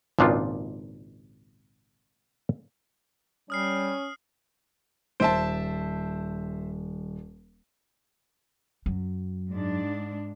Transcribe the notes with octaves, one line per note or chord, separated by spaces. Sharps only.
G#1 C#2 A#2 D4 D#4 F4
G3 C#4 D#6 F6 C7
D#1 C5 E5 A5 D7
F#2 F#3
G#2 D4